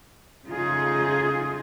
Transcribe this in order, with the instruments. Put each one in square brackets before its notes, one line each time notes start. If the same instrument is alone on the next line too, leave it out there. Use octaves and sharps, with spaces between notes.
[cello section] C#3 A3 D#4 F4 G#4